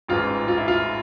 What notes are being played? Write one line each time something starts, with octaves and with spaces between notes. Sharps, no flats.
A1 G#2 E3 F4
F4
E4
F4